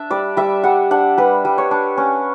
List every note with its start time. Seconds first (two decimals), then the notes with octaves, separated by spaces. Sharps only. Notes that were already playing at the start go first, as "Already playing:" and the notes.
Already playing: D4 E5
0.10 G3 D5
0.37 G3 E5
0.64 G3 F#5
0.91 D4 F#5
1.17 G3 B4
1.45 G3
1.58 C#5
1.71 D4
1.97 C#4